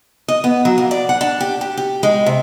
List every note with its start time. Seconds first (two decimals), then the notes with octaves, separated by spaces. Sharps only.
0.28 D#5
0.44 B3
0.65 F#3
0.78 A#3
0.91 D5
1.09 F#5
1.21 D4
1.41 G4
1.61 G4
1.77 G4
2.03 G#3
2.26 C3